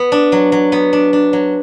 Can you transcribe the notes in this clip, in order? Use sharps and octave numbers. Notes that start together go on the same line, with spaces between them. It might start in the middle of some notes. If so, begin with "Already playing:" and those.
Already playing: B3
D4
F#3
F#3
B3
D4
D4
F#3